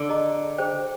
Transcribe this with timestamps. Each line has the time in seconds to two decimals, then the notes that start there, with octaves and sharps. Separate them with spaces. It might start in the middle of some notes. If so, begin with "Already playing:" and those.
Already playing: D3
0.09 G#4 D#5 A#5
0.58 D4 G#4 C5 G5